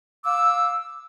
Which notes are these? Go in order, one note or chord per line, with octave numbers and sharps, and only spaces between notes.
F5 D6 E6